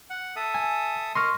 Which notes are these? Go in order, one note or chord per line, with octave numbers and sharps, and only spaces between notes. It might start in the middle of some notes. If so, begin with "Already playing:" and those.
F#5
A4 E5 D#6
G#5
A#4 D#5 C6 C#6 F6